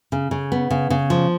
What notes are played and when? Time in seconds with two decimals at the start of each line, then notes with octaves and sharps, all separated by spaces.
0.12 C#3
0.31 C#3
0.52 B3
0.71 C#3
0.90 C#3
1.10 F3